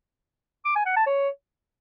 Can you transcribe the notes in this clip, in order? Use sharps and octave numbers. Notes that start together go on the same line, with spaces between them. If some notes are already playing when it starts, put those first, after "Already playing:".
D6
G#5
F#5
A5
C#5